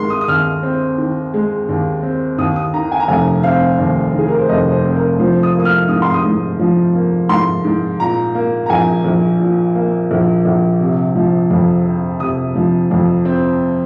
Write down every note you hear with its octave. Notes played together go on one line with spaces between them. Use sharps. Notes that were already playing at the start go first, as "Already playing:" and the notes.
Already playing: D#3 G#3 A#4 C6
D#6
D#6
D#2 F6
C4
D#3
G#3
D#2
C4
D#2 D#6
D#6
D#3 A#5
G#5
A#5
F1 G#5
C4 F5
D#2
D#3 G#4
A#4
C5
F1 D#5
C5
C4
A#4
F3 C5
D#6
A#3
D#6
F6
G#2 D#6
C6
D#6
G#2
F3
A#3
G#2 C6
G#2
A#2 A#5
A#3
A#5
A#1 G#5
A#1
A#2
A#3
A#1
A#1
C3
F3
F2
C4
C3 D#6
F3
F2
C4